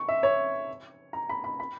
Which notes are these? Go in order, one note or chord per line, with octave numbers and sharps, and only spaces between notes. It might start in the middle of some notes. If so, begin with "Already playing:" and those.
Already playing: C#6
E5
C#5
A#5
B5
B5
B5